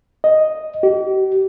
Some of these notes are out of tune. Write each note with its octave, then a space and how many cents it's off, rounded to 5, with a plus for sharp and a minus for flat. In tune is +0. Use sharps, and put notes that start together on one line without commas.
D#5 +0
G4 -40